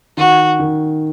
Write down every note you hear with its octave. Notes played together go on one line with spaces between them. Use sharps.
D#3 F#4
D#3